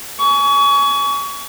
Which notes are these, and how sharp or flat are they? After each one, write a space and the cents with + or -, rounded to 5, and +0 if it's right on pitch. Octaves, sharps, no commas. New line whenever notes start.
G#5 +20 C#6 +30